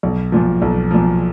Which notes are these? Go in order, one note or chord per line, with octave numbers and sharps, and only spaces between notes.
B1
A#2 F3
B1
A#2 F3